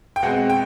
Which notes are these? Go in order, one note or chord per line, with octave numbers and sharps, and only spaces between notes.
G5
B2 G#3 C4 F#5
G5